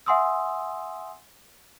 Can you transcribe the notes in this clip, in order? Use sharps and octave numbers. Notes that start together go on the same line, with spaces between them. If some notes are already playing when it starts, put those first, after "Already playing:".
E5 F#5 G#5 C6 D#6 E6